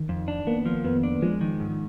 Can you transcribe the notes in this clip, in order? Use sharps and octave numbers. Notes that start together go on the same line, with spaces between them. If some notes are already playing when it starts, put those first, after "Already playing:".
Already playing: D#3
F2
D4
A#3 B3
F3
F2 B3
D4
F3 G#3
D#3
G#2